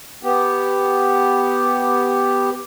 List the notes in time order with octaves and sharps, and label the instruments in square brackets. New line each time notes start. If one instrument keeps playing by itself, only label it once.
[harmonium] B3 G4